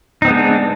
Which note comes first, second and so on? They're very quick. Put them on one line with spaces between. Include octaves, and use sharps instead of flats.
D#4 C4 B3 G#3 D4